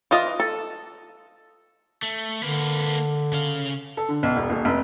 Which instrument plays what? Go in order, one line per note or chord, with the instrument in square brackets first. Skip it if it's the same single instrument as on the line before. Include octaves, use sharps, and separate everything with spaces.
[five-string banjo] E3 F4 D#5
A4
[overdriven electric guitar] A3
[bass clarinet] D3 [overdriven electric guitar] A#3 B4
[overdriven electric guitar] C#3 F5
[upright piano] A4
D3
B1
E1
D#1
F1